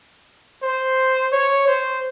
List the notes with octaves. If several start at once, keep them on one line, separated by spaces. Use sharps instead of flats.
C5
C#5
C5